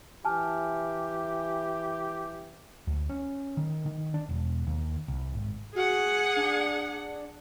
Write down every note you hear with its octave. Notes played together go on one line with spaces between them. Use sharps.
E3 G4 G#5 A5 F6
D2
C#4
D#3
D#3
D4
E1
D#2
C2
G#1
F#4 G#4 F#5
D4